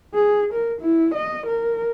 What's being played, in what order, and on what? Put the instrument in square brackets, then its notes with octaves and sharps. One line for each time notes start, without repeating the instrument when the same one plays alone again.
[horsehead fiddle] G#4
A#4
E4
D#5
A#4